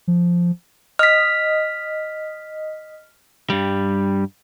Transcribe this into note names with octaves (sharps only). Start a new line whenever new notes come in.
F3
D#5 F6 B6
G2 G3